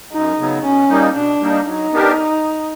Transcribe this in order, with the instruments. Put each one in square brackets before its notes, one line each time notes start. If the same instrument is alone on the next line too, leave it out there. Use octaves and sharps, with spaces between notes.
[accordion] F#2 [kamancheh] D#4
[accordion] C#3 F#3 B3
[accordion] B2 [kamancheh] C#4
[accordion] G3 A#3 D#4
[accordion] B2 [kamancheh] D4
[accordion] G3 A#3 D#4
[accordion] F#3 [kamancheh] D#4
[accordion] B3 D4 G4 A#4